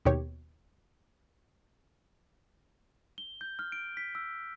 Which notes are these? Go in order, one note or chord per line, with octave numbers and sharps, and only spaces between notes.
D#2 B2 G4 C#5
G7
G6
F6
D7
B6
E6